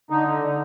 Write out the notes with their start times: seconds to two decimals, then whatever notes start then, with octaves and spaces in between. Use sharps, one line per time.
0.10 D3 D#4
0.48 D3